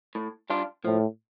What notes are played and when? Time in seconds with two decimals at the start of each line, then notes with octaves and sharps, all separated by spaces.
0.15 A2
0.50 G3 D4 F4
0.85 A2 F3